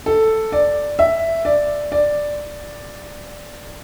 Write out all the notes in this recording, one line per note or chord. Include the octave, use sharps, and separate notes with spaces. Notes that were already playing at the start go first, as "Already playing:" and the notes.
A4
D5
E5
D5
D5